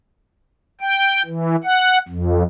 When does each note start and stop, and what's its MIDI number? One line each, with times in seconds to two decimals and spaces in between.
0.81 1.22 79
1.26 1.56 52
1.64 1.98 78
2.08 2.43 41